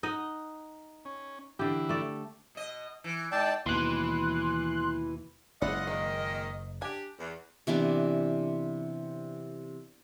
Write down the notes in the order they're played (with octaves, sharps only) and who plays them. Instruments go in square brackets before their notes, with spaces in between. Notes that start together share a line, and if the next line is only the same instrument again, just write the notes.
[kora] D#4 D#5 F#5
[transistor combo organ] C#4
[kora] D3 G4 [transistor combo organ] E3 E4
[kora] A3 D5
[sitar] B2 D#5
E3
[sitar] G#2 [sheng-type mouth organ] D5 G5 A5
[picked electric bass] D#2 B2 [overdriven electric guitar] E3 [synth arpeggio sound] C6 F#6
[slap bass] F#1 [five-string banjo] G#3 E4 D5 [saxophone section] F4 F#5 [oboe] D#5
[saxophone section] A#2 D#3 [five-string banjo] G#3
[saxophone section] D4 G4 [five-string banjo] G#5
[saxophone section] E2
[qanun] C3 E3 B3 D4